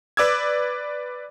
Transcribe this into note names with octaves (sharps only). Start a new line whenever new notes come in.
B4 D5 D6 E6 G#6